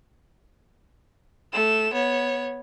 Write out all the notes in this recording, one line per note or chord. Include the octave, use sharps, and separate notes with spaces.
A3 E7
B3 C#5